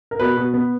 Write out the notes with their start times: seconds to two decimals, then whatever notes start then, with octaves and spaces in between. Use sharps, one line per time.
0.11 A#4
0.20 B2 B4
0.37 B2
0.54 B3